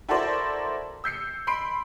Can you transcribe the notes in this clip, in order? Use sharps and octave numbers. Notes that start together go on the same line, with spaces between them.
E4 F#4 A4 A#4 C5 D5
E6 G6 C7 C#7
B5 C6 C7 D7